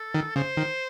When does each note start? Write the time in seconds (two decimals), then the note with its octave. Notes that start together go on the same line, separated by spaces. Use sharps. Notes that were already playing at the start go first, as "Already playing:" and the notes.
Already playing: A4
0.14 D#3
0.36 C#3 C5
0.57 D#3